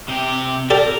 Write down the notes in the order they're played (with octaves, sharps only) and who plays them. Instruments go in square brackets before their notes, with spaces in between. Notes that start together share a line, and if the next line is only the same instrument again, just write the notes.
[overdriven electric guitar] C3 G4
[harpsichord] G4 A4 D5 [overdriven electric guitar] A#4